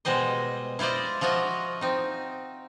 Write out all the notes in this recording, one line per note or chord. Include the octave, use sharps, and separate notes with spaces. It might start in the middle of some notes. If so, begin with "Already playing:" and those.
B2 G3 G#3 C5 D#5
E4 F4 C5 D5 D#5
F3 F4 F#4 D#5 E5
C4 D#4